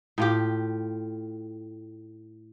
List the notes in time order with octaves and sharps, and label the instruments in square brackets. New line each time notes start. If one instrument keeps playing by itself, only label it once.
[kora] A2 F4 G4